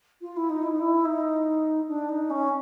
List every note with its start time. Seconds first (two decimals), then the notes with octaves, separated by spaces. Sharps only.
0.22 F4
0.37 E4
0.50 D#4
0.63 E4
0.72 D#4
0.80 E4
1.05 D#4
1.88 D4
2.09 D#4
2.30 C#4